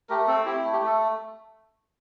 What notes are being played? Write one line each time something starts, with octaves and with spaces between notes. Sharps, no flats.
A3 G4 A#4
C4 A4
E4 G4
A3
G4
A3 A4